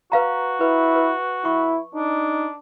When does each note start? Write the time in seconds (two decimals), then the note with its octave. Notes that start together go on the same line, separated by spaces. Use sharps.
0.12 F#4 B4 F5 A#5
0.61 E4 B4
0.96 B4
1.45 E4 C#6
1.95 D4 D#4